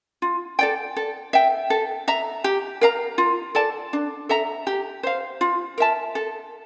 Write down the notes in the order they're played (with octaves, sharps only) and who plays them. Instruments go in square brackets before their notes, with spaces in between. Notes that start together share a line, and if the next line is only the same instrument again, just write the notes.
[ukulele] F4
A4 D5 G5
A4
E5 G5
A4
E5 A#5
G4
A#4 F5 A#5
F4
A4 D5 A5
D4
A4 E5 A#5
G4
C5 F5
F4
A#4 E5 A5
A4